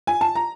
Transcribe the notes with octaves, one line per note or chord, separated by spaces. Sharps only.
G#5
A5
A#5